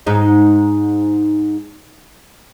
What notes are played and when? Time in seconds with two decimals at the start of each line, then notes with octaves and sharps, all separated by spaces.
0.06 G#2 D#4